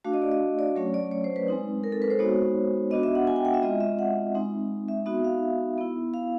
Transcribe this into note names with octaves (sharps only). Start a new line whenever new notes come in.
A3 D4 F#4 F5
D#5
D5
D#5
D5
F#3 A3 C#4 C#5
D5
C#5
C5
B4
G#3 C4 D#4
A#4
A4
B4
C5
G#3 B3 D#4 F#4 C#5
B3 D4 F#4 D#5
E5
F#5
G#5
G5
F#5
E5
G#3 C4 F4 D#5
E5
F#5
G#3 C4 D#4
E5
B3 D#4 F#4 E5
F5
B3 E4
F5